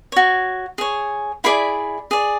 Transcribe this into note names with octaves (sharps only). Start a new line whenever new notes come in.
F#4 C#5
G#4 C#5
E4 G#4 D5 B5
G#4 D5